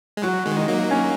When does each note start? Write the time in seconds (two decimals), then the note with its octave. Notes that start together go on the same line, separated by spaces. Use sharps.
0.17 G#3
0.23 F#3 F#4
0.46 D#3 G#3
0.57 D#4
0.68 F#3 A#3
0.91 C#4